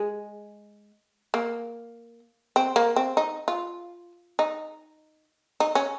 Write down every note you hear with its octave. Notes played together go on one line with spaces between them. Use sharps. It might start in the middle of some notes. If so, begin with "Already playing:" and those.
Already playing: G#3
A#3
C4
A#3
C4
D#4
F4
D#4
D#4
C#4